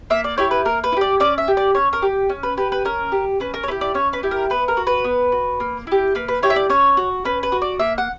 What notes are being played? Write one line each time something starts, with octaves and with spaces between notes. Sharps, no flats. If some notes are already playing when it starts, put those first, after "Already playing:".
A#3 E5
D5
E4 G4 C#5
B4
A#3 A#4
B4
E4
G4 D5
C#4 D5
E5
G4
D5
C#4 C#5
A#4
G4
C#4
B4
G4 B4
B4
C#4 A#4
G4
C#4 B4
A#4
C#5
E4 G4 B4
D5
C#4 C#5
B4
E4 G4
A#4
B3 B4
A#4
F#4
B4
B3
F#4
A#3
E4 G4
A#3 B4
B4
E4 G4 C#5
E5
D5
C#4 C#5
F#4
C#4 B4
B4
F#4
D5
A#3 E5
F#5